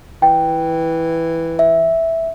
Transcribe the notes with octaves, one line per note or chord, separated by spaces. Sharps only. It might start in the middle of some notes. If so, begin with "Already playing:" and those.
E3 G5
E5